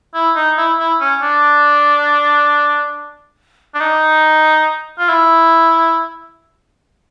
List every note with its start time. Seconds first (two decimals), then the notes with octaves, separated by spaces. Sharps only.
0.14 E4
0.36 D#4
0.58 E4
0.79 E4
1.01 C#4
1.22 D4
3.74 D4
3.81 D#4
4.99 F4
5.09 E4